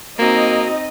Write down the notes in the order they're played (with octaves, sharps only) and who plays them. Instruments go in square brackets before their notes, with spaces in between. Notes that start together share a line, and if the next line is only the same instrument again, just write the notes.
[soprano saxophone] A#3 [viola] C4 D#4 [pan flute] F#4 [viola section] D#5